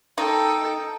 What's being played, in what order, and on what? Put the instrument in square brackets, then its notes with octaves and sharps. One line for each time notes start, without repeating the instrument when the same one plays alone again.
[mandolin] D#4 [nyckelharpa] A4 G5